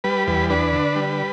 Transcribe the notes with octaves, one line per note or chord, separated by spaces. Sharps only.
G3 B4
E2 B4
D4 B4
D3
G3